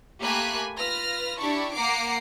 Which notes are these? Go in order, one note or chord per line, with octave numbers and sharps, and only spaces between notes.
A3 A#3 G4 G#5 B5 F#6
F4 B4 F6 A#6
D4 E4 G4 A5 B5 C#6
A#3 F#5 A#5 D6 C7 D7